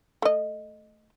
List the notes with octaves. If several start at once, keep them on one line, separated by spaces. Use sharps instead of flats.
A3 D#5